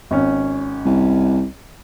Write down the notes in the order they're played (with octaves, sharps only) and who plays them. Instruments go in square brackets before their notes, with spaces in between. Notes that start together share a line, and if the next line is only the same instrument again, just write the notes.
[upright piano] G#1 C#4
[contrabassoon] C2